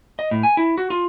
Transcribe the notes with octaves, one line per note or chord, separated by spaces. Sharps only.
D#5
A2
G#5
E4
F#4
F4